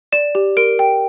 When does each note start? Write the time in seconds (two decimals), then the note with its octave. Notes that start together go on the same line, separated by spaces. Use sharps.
0.12 D5 E7
0.35 G4
0.57 A#4 D7
0.79 G5